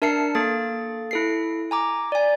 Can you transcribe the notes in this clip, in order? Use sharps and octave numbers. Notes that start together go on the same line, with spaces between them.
D4 A#4 E5 A5 C7 C#7
A#3 A4 A6
E4 A4 C7
G#5 A#5 D6
D5 G#5